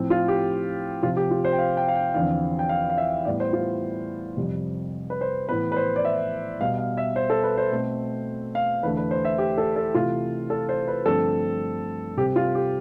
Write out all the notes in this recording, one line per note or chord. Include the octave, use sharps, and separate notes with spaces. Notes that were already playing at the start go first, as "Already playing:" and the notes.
Already playing: A2 F3 C4
F4
G4
C3 F3 C4 F4
G4
F4
C5
G5
F5
G5
F5
G5
E2 D3 F3 C4 F5
G5
F5
F5
E5
A2 G3 B3 D5
C5
F4
F2 C3 G3
B4
C5
A2 E3 B3 B4
B4
C5
D5
E5
B2 G3 B3 F5
F5
E5
C5
A4
B4
C5
B2 A3 C4
F5
E2 D3 A3 B4
B4
C5
E5
G4
A4
A4
C3 E3 A3 F4
A4
C5
B4
G2 D3 F3 A3 C4 A4
C3 G3 C4 G4
F4
G4